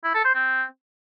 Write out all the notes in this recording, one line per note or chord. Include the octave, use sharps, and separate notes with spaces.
E4
A4
C5
C4